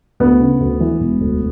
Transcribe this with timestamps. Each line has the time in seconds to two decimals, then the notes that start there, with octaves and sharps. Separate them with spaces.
0.20 D2 B3
0.40 C#3
0.61 D2
0.80 E3
1.00 E1
1.21 D2